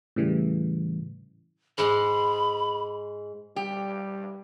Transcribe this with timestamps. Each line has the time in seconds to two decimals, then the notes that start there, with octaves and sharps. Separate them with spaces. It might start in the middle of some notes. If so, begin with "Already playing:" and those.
0.16 A2 C#3 E3 G3
1.78 G#2 G#3 B5
3.56 G3 G4